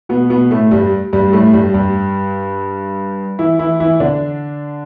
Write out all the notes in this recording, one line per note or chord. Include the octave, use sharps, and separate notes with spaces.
B2 B3
B2 B3
A2 A3
G2 G3
G2 G3
A2 A3
G2 G3
G2 G3
E3 E4
E3 E4
E3 E4
D3 D4